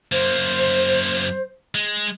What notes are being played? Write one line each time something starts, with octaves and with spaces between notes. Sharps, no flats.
F#2 A#3 C5
G#3